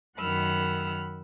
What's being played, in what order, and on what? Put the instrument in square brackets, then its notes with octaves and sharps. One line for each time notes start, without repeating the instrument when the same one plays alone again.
[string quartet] F#2 D#3 F#5 B5 E6 F6